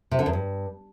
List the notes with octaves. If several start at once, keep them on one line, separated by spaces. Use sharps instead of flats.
C3
D3
E2
G2